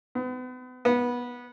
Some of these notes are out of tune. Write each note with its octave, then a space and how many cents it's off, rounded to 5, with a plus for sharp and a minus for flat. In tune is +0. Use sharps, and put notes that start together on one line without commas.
B3 +40
B3 -15